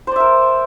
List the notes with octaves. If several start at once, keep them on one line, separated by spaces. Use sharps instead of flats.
A#4 C5 D5 E5